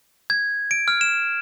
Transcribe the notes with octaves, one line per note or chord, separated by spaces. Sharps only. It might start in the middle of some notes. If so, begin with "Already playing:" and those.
G#6
D7
F6
E7